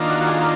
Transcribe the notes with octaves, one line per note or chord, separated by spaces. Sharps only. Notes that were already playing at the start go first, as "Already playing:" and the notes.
Already playing: D#3 A#3 D4 F4
F#4
F#4
G#4